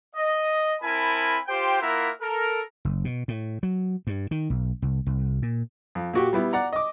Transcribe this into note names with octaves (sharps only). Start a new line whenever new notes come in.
D#5
C4 E4 A#4 G#5 A5 B5
F4 G4 C5 G5
A#3 E4 F4 A#4 E5 F#5
A4 A#4
F#1
B2
A2
F#3
G2
D#3
B1
C2
C2
A#2
F2
A#2 F#4 G4
G3 B3 E4
D5 F#5 A#5
D#5 D6